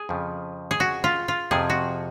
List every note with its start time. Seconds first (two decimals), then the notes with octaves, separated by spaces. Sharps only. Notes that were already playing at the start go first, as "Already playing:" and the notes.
Already playing: G#4
0.09 F2 C#3 F3
0.71 G#4
0.80 F#4
1.04 F4
1.28 F4
1.51 F2 C3 F3 G#4
1.70 F#4